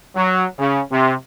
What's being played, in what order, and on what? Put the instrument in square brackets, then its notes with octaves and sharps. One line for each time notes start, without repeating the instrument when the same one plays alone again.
[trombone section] F#3
C#3
C3